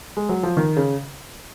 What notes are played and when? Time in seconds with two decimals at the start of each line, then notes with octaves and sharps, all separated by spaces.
0.17 G#3
0.29 F#3
0.43 F3
0.57 D#3
0.76 C#3